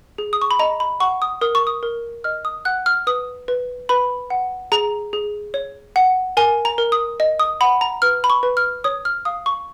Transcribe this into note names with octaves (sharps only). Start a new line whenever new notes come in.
G#4
D#6
C#6
B5
D#5 A#5
B5
F#5 C#6
D#6
A#4 D#6
C#6
D#6
A#4
D#5 F6
D#6
F#5 F#6
F6
B4 D#6
B4
B4 B5
F#5
G#4 A#5
G#4
C#5
F#5
A#4 G#5
A#5
A#4
D#6
D#5
D#6
F#5 B5
A#5
B4 F6
B5
C#6
B4
F6
C#5 D#6
F6
F5 D#6
C#6